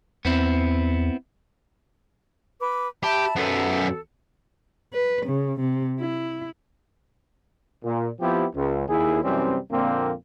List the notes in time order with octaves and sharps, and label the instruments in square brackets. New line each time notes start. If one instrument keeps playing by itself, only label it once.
[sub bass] E2 [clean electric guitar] B3 C4 E4
[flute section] B4 D6
[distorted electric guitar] G4 [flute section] E5 A5 B5
[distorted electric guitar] F#2 B3 [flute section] A4
[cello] B4
C#3
C3
E4
[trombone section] A#2
F3 B3 C4 E4 G4
C#2
D#2 E4 G#4
F#2 C3 E3 G3 C4 C#4
F2 A#2 D3 A#3 C4